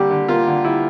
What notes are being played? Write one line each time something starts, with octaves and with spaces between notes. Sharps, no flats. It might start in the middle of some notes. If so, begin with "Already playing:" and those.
Already playing: D3 G3 A#3 G4
D3
A#3 F4
D3
G3 E4